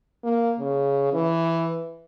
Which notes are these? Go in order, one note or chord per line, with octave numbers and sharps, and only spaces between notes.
A#3
C#3
E3